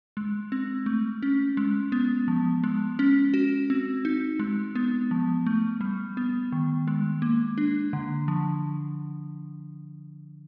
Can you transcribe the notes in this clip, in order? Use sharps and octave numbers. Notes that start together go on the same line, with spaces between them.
G#3
C4
A3
C#4
G#3
B3
F3
G#3
C#4
F#4
C4
D#4
G#3
B3
F3
A3
G3
B3
D#3
G#3
A#3
D4
D3
F3